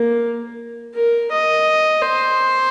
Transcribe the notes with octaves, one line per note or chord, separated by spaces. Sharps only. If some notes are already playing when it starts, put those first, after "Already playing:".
Already playing: A#3
A#4
D#5
C5